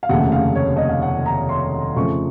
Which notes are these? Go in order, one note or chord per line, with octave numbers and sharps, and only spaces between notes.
F5
F1 D#2 C#3 A3 F#5
F5
C#5
D#5
F5
F#5
A#5
C6
F2 C#3 F3 A3 C#6